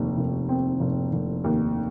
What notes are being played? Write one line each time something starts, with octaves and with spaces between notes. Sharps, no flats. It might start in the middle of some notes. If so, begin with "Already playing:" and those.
Already playing: F1 D#2
F1
C4
F1
F1
D#2